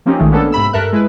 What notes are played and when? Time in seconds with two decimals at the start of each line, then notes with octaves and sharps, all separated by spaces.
0.06 F3 A#3 C4 C#4 D#4 G4
0.19 A#1 D#3 F3 G#3 A3
0.31 A#3 B3 C#4 D4 A4
0.52 G#2 C3 B5 E6
0.73 G2 A4 A#4 E5 F#6
0.92 G#3 E4 B4